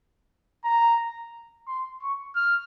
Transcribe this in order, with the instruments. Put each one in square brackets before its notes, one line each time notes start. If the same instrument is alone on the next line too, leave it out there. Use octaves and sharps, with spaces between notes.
[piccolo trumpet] A#5
C6
C#6
F6